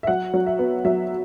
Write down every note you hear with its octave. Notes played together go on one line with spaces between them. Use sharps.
E5
F#3 F#5
F#3
E5
B3
F#3 E5